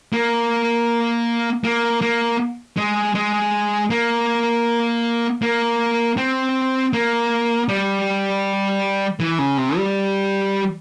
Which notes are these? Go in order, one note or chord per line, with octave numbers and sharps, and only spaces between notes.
A#3
A#3
A#3
G#3
G#3
A#3
A#3
C4
A#3
G3
E3
C#3
C3
G3